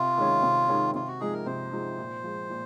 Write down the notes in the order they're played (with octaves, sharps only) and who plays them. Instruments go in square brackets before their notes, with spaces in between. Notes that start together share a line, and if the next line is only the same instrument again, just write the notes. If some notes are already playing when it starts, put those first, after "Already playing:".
Already playing: [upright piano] C3 [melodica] F4
[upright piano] D#3 G#3 C#4
C3
D#3 G#3 C#4
[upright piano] C3 [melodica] F4
[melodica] F#4
[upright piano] F3 G#3 D#4 [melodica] G#4
[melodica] A#4
[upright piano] C3 [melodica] C5
[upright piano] F3 G#3 D#4
A#2
F3 G#3
A#2